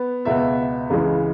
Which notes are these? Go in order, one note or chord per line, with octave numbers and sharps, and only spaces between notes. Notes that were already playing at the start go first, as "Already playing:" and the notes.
Already playing: B3
C#2 B2 B3 E5
C#2 C#3 E3 G#3